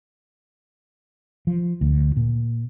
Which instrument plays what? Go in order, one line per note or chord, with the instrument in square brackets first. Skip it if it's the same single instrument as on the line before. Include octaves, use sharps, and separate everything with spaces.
[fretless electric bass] F3
D2
A#2